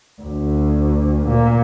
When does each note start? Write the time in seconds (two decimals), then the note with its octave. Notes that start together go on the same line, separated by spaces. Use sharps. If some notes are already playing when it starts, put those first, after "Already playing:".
0.22 D2
1.28 A#2